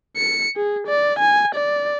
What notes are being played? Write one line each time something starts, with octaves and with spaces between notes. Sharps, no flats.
C#7
G#4
D5
G#5
D5